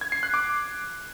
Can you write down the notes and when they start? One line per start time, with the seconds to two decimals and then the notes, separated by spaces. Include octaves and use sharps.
0.01 G#6
0.12 C7
0.23 F#6
0.34 D6